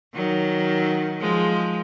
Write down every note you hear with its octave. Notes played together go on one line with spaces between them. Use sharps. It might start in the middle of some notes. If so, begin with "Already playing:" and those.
D#3 F#3
F3 G#3